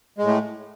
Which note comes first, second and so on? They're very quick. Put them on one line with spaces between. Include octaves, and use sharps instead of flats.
G#3 A2 A3